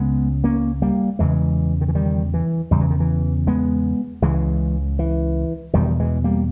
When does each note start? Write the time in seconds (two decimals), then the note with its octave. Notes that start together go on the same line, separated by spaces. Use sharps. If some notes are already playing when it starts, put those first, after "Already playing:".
Already playing: C#2 C#3 G#3 B3
0.44 A#3 C#4
0.82 G3 A#3
1.19 E2 C#3 E3 G#3
1.81 D#3
1.88 E3
1.95 D#3 G3
2.34 E3
2.71 E2 C#3 G3
2.81 E3
2.91 D#3
3.00 E3
3.47 G#3 B3
4.22 C#2 C#3 E3 G#3
4.99 E3
5.74 E2 B2 D#3 G3
6.00 E3 G#3
6.24 G3 A#3